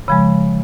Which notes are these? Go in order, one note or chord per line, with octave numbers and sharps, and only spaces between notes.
C#3 F3 G#3 B5